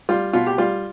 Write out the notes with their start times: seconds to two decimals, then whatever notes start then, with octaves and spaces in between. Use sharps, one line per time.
0.09 G3 F4
0.33 B2 F4
0.47 G4
0.58 G3 F4